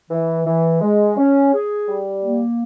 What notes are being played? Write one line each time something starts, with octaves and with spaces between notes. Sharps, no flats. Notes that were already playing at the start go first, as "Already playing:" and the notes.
E3
E3
G#3
C#4
G#4
G3
A#3